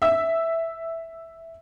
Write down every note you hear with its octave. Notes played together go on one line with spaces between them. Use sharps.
E5 E6